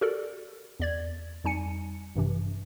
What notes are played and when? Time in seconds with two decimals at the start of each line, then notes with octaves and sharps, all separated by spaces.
0.01 F#4 G4 A4 A#4 D5
0.80 E2 D5 G#6
1.44 F2 G3 D#4 G#5 C#7
2.15 A1 G2 C3 E3